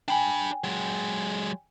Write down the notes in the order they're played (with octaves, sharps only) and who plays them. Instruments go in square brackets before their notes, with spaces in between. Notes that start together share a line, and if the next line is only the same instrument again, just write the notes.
[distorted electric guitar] D4 B5 [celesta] G5 G#5
[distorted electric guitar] F#3 G#3